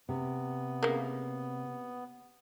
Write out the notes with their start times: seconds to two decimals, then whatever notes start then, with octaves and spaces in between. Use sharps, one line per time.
0.09 C3 B3
0.83 C#3 A#3